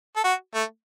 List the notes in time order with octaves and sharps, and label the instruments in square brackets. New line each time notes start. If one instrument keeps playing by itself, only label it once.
[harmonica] A4
F#4
A3